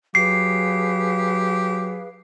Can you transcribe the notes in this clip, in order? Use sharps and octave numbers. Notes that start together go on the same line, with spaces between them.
F#3 G4 G#4 B4 F5 C7